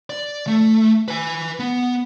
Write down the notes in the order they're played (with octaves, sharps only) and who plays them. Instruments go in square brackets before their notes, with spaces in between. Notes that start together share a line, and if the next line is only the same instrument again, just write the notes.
[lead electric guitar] D5
A3
B4 G#5
B3